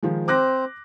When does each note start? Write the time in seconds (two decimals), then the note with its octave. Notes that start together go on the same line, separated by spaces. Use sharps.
0.03 D#3 F3 G#3
0.28 C4 C5 D6 F#6 A#6